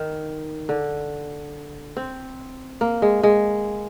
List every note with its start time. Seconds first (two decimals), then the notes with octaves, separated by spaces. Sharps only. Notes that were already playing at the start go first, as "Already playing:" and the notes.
Already playing: D#3
0.69 D3
1.97 C4
2.81 A#3
3.02 G#3
3.23 G#3